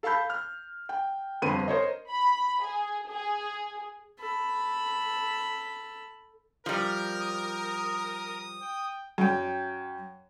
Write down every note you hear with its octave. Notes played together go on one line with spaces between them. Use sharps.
A4 F5 A5 B5 G6
F6
G5
G1 F2 C4 B4 D#7
A#4 C5 C#5 D#5
B5
G#4
G#4
A4 B5
F3 G3 A#4
D#6
G5
F#2 G5